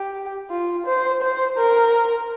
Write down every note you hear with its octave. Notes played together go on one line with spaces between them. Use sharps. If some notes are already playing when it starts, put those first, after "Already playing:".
Already playing: G4
F4
C5
C5
A#4